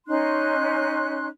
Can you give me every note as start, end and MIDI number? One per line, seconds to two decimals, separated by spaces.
0.07 1.26 61
0.07 1.26 63
0.07 1.26 84
0.07 1.26 90